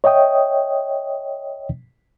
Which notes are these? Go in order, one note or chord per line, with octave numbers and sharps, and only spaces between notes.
C#5 D#5 E5 G5 D#6